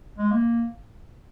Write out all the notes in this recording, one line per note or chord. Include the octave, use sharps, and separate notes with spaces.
G#3
A#3